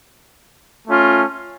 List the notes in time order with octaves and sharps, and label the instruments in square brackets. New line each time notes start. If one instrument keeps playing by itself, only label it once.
[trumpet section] A3 C#4 F4